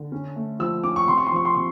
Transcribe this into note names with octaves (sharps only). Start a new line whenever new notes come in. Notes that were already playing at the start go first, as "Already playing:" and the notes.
Already playing: D3
C#4
A3
F3 E6
C#4 D6
C#6
C3 C6
C#6
C6
F3 C#6
C6
C3 C#6